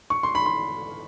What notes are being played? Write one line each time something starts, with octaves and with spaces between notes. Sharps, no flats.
C#6
C6
B5
C6